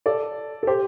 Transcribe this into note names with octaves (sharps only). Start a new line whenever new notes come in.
A4 D5
A4
G4 C5